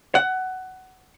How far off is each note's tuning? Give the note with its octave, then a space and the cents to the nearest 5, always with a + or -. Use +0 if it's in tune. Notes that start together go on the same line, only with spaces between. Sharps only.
F#5 +15